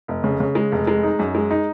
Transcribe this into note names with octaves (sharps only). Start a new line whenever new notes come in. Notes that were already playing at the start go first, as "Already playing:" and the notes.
F1
C#3
C#3
G#3
F1
G#3
D#4
F#2
G#3
D#4